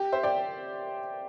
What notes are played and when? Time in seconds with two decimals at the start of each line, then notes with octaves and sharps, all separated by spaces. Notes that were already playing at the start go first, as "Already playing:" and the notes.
Already playing: G4
0.12 C5 E5
0.23 D5 G5